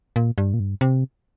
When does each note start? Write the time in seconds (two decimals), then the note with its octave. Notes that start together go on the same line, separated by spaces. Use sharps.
0.16 A#2
0.38 G2
0.54 A#2
0.60 G2
0.81 C3